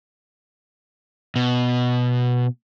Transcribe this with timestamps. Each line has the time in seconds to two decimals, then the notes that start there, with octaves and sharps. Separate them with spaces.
1.36 B2